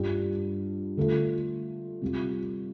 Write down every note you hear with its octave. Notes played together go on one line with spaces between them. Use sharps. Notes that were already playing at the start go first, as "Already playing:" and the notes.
Already playing: G2 G3 D4 F4
D3 A3 F4
C3 G3 F4